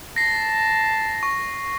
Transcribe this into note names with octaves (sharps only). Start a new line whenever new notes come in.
A5 A#6 C7
C#6